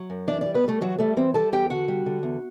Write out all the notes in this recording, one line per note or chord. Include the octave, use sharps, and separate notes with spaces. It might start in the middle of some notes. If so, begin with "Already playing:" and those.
Already playing: F#3
F#2
E3 D4 D5
D4 D5
G3
B3 B4
G3 A3 A4
E3 F#3 F#4
G3 A3 A4
E3 C4 C5
G3 A4 A5
E2 G4 G5
D3 F#4 F#5
G3
D3
E2